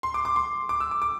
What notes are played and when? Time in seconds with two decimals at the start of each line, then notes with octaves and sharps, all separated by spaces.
0.03 C6
0.14 D6
0.25 D6
0.36 C6
0.69 D6
0.80 E6
0.91 D6
1.02 D6